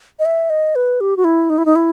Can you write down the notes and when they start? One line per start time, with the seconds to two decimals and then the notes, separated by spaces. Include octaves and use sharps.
0.19 D#5
0.25 E5
0.50 D#5
0.75 B4
1.01 G4
1.17 F#4
1.24 E4
1.50 D#4
1.58 E4
1.65 D#4
1.76 E4